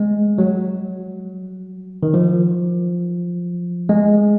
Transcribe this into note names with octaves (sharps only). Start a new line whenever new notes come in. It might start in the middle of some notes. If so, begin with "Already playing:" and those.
Already playing: G#3
F#3
D#3
F3
G#3